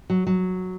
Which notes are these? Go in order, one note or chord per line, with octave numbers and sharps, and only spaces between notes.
F#3
F#3